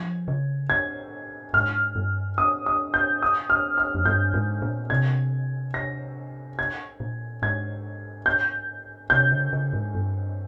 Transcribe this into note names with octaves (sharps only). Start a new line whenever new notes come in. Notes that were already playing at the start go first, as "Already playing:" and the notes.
Already playing: F3 G#6
C#3
G#6
G#2 F6
G2
D#6
D#6
G6
D#6
F6
F6
F2
G2 G6
G#2
A#2
C3 G#6
A#6
G#6
A#2
G#2 G#6
G6
C3 G6
C#3
C#3
G#2
G2